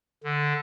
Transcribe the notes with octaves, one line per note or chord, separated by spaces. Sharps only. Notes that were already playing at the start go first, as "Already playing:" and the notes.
D3